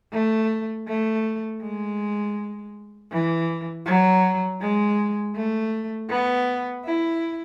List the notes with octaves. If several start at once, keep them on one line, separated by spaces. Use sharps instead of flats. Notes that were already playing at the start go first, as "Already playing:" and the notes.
A3
A3
G#3
E3
F#3
G#3
A3
B3
E4